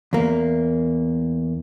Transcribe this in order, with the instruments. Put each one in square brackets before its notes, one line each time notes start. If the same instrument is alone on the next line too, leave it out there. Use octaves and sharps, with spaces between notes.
[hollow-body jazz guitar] E2 A#3